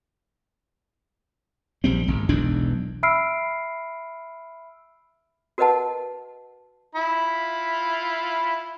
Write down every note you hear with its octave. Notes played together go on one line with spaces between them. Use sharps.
A#1 G3 C4
G#1
E1 B1 E2 D4
E5 B5 E6 F6 C7 D7
F#4 A#4 B4 D#5 F#5 A5
E4 F4 B5